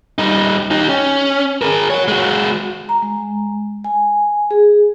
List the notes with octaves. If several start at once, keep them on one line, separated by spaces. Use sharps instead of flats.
G3 D#4
D#4 G4
C#4
G#4 A#4
F#4 C#5
G#3 F#4
A#5
G#3
G#5
G#4